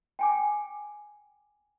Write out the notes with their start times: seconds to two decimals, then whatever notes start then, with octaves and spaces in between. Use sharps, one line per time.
0.19 G5 G#5 D6